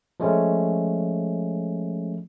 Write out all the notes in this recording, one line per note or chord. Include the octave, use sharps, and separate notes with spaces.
F3 G#3 A3 C#4